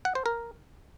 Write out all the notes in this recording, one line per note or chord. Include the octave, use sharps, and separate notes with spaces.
F#5
C5
A#4